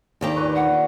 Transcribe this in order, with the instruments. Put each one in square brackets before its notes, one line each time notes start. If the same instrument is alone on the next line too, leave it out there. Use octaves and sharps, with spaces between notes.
[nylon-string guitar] D#2 D#3 G4 [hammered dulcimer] D3
[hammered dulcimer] A#2 B4 C#5
[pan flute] F#5